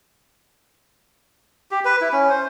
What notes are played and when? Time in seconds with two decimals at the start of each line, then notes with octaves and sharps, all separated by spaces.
1.71 G4
1.85 B4
2.01 E4
2.12 C#4
2.30 C5